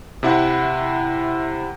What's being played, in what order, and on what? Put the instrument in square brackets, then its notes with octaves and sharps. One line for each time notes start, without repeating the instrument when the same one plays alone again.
[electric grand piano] C3 E4 F#5